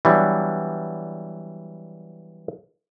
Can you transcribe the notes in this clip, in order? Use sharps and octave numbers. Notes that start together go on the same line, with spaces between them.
E3 F#3 G3 B3 D4